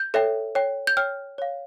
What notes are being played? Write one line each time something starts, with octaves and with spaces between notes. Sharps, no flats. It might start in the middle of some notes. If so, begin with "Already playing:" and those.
Already playing: G6
A4 C#5 E5 G5
C#5 G5
G6
C#5 G5 F6
C#5 F5